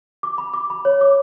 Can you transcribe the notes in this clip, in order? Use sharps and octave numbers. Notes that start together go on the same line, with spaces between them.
D6
B5
D6
B5
C#5
D6